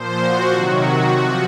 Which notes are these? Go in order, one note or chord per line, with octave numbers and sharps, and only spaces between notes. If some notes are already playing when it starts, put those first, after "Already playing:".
Already playing: A#2 F3 C5
F#4
C3 D#3 F#3
F#4
C3 F3